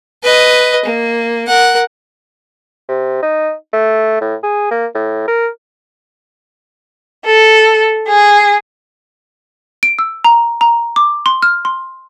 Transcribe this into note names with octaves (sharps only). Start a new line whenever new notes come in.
B4 D#5
A#3
A#4 F#5
C3
D#4
A3
A2
G#4
A#3
A2
A#4
A4
G#4
D7
E6
A#5
A#5
D6
C6
F6
C6